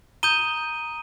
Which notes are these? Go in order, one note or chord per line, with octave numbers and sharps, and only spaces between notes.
A#5 D#6 G6 D#7 G7